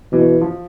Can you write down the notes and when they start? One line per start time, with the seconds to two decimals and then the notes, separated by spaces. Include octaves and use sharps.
0.12 B2 E3
0.41 F3